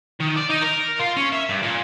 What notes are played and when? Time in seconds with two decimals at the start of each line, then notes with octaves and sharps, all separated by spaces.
0.20 D#3
0.36 D5
0.49 D#4
0.61 A#4
0.99 F4
1.17 C#4
1.32 E5
1.49 G2
1.62 A#2